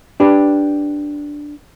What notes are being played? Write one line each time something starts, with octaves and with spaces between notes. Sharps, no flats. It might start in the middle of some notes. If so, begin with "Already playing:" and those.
D4 G4 B4